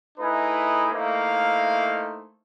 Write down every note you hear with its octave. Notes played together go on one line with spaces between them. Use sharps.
A3 D#4 E4 G#4 B4
A3 A#3 D#4 E4 C5 F5